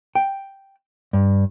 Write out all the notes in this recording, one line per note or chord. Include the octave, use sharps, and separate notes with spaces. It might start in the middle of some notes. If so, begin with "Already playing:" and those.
G5
G2